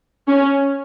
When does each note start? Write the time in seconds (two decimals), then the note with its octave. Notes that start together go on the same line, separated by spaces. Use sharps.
0.28 C#4